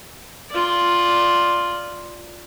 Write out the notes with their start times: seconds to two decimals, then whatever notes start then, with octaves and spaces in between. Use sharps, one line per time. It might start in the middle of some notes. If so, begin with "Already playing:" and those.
0.50 F4 D5